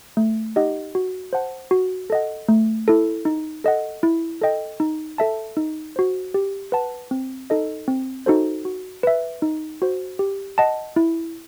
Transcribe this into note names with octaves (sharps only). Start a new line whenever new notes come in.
A3
D#4 G4 D#5 F#5
F#4
C5 F#5 A5
F#4
A4 D#5 F#5
A3
E4 A4
D#4
A4 D#5 F#5
E4
A4 D#5 G5
D#4
A4 E5 A5
D#4
F#4 C5
G4
B4 F#5 A5
C4
D#4 A4 D#5
C4
D#4 F#4 A4 C5
F#4
B4 E5
D#4
F#4 C5
G4
D#5 F#5 A5
E4